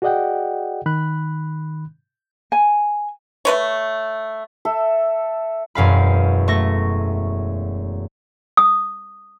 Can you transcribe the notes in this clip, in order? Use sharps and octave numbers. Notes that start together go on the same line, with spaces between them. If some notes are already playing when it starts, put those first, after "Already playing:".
F#4 G#4 D5 D#5 F#5 G5
D#3 B5 F#6
G#5
A3 B4 C#5
A4 E5
E1 F#2 F5 B5
A3 C#6 A#6
D#6